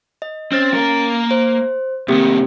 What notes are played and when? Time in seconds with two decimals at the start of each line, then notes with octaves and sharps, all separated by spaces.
0.22 D#5
0.52 C4 C#4 F6 A6
0.74 A#3 A#4
1.31 C5
2.08 C2 D#3 A#3 C4 G4